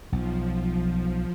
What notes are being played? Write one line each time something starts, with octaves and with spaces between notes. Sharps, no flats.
B1 F3